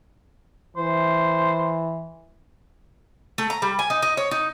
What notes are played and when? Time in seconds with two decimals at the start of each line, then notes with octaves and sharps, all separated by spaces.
0.77 E3 C5
3.38 A3
3.50 A#5
3.62 G3
3.79 G#5
3.90 D#4
4.02 D#4
4.17 C#5
4.31 D#4